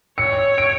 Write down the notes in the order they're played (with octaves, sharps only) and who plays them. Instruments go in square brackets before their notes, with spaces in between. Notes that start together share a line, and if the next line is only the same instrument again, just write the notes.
[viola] C#5 [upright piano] C#7
[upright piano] D7